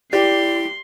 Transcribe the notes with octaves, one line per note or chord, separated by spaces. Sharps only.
E4 G4 D5 C6